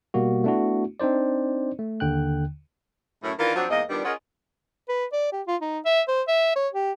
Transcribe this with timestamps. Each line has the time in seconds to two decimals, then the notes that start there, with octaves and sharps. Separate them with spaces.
0.14 B2 G3 A#3 F#4
0.44 A3 B3 D4 E4 F#4
1.00 C4 D4 D#4 C5 D5
1.79 A3
2.00 D#2 D3 G5 F#6
3.23 F#2 A2 A3 C#4 E4
3.39 D#3 E3 D4 F4 A#4
3.56 F3 F#3 C4 D4 F#4
3.70 E2 G#2 A#3 D#5
3.90 D#3 F3 G3 B3 D4
4.05 C#4 F4 G#4 A#4 D#5 F#5
4.89 B4
5.13 D5
5.32 G4
5.47 F4
5.62 D#4
5.85 E5
6.08 C5
6.28 E5
6.56 C#5
6.73 G4